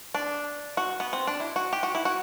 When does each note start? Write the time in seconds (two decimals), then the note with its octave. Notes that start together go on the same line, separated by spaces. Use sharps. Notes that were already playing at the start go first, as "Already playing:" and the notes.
0.15 D4
0.77 F#4
1.00 B3
1.13 C4
1.27 D4
1.40 E4
1.56 F#4
1.73 G4
1.83 F#4
1.95 E4
2.05 F#4